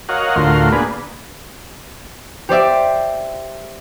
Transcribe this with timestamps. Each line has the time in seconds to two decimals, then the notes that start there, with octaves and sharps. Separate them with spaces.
0.09 F#4 A#4 C#5 D#5 F5 F#5
0.36 D2 A2 F4 F#4 A#4 C6
0.72 A#3 B3 D4 G#4 B4
2.49 G4 C5 D5 E5